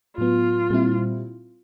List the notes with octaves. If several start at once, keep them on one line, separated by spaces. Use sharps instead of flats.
A2 F#3 B3 F4
A#2 G3 C4 E4